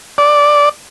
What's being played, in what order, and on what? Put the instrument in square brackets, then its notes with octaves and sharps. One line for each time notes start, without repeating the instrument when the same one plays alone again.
[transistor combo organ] D5